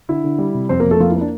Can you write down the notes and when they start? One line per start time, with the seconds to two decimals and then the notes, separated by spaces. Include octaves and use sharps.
0.09 D3 E4
0.24 D3
0.38 G3
0.54 C3
0.69 F2 C4 C5
0.80 A#3 A#4
0.86 F2
0.91 A3 A4
1.00 F3 A#3 F4
1.11 E4
1.16 A#3 D4